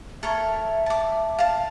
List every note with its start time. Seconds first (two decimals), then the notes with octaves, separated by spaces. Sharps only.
0.23 A4 A#4 C#5 E5
0.86 A5 D6
1.39 F5 A5